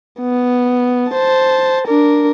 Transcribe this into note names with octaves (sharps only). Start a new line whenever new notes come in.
B3
C5 A5
D4 A#4